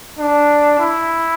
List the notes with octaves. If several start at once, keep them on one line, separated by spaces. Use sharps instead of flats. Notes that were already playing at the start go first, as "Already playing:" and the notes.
D4
E4